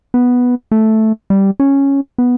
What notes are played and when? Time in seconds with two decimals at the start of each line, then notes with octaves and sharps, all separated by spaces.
0.14 B3
0.71 A3
1.30 G3
1.60 C#4
2.18 B3